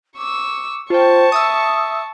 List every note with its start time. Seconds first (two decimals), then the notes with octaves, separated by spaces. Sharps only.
0.17 C#6 D6 E6
0.90 F4 C5 G5 A5 C#6
1.32 E5 D#6 E6